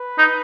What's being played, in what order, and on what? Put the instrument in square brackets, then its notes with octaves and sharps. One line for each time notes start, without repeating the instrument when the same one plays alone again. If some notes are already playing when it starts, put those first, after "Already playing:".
Already playing: [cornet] B4
[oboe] D#4